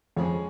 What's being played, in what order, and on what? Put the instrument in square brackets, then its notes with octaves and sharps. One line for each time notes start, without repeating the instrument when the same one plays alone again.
[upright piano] F2 F3 [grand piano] G#3 C#4 G#4 C#5